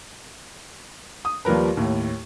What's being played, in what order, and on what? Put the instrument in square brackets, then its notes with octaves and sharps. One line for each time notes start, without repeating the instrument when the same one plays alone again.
[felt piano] D#6
D#2 F3 G3 A#4 B4
D#2 A2